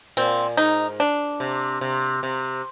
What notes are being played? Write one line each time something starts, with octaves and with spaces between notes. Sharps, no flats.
A#2 C4
G#2 D#4
D4
C3
C3
C3